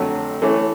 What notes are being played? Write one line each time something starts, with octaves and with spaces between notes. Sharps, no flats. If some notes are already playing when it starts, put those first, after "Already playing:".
Already playing: F2 D3 F#3 A3
E3 A3 C#4